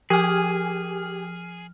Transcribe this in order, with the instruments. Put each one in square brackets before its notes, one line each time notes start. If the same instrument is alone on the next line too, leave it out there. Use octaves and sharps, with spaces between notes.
[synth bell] F3 F6 [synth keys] G4 G#5 [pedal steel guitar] G#4